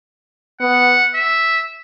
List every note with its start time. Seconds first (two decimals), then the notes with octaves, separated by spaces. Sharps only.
0.61 B3 F#5
1.15 E5